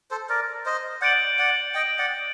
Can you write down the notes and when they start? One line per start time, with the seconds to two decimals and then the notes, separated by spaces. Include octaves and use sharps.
0.11 A4 C5
0.29 A#4 D5
0.66 C5 D#5
1.01 D5 F#5 G6 D7 F#7
1.39 D5 F#5
1.74 D#5 G5
1.99 D5 F#5